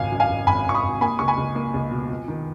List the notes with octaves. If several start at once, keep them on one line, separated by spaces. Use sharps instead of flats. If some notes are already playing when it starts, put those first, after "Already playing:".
Already playing: G#1 C#2 F5 G#5
F#2
F5 G#5
G#1
G#1 G#5 B5
G#1 C#6
B5 D#6
G#1
A#3 G#5 B5
C#2 C#6
G#5 B5
C#2
A#3
C#2
B2
F2
D#3